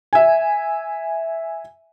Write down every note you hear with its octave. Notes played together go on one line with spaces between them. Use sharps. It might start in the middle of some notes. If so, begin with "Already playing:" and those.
E5 G#5